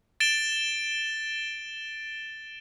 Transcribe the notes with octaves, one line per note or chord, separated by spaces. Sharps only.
A6 D7 E7 G7